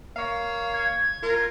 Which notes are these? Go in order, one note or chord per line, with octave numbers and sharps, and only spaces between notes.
A#3 C#5 F5
G#6
F4 A#4